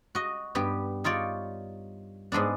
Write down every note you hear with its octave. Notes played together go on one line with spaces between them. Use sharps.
F#4 D#5
G2 B3 G4
D#4 F4 C#5 D5
G#2 G#3 B3 D4